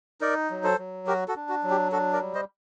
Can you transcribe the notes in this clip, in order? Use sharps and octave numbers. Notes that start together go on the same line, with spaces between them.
D#4 A#4 D5
F#3
A4 C5
F#3
F#4 G4 A#4
F#4 A4
D4
F#4
F#3
G4
D4 F#4 A4
A#4 D5
G3
C5 D#5